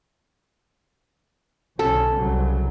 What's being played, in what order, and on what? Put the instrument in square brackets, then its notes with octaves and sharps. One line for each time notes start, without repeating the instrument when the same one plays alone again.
[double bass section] B1 D3 C#4 [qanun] A4
[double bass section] C2 C#3 F#3